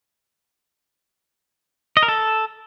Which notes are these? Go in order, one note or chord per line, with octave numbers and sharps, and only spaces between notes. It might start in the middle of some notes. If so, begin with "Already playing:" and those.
D#5
A#4
A4